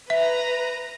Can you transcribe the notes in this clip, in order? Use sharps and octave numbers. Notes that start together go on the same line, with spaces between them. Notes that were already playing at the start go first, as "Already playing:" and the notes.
B4 E5 A#5